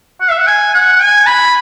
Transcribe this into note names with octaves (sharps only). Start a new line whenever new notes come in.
F#5
E5
F#5
G#5
F#5
G#5
B5